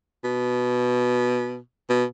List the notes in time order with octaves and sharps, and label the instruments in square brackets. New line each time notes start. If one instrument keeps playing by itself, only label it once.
[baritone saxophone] B2
B2